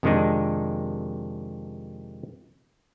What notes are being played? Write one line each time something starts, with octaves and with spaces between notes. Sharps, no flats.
F2 C3 D#3 G#3 D4 D#4